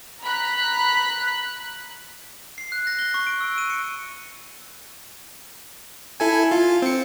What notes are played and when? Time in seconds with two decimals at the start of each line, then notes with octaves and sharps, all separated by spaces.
0.22 A#5 B5 F#6 B6
2.58 C7
2.72 F#6
2.87 A#6
2.99 G7
3.14 C#6
3.27 D7
3.40 E6
3.58 D#7
3.70 C#7
6.20 E4 A4 G#5
6.52 F4
6.82 C4 C#7